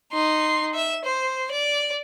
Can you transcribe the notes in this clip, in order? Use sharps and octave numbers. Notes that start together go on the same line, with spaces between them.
D#4 C6
E5 E7
C5
D5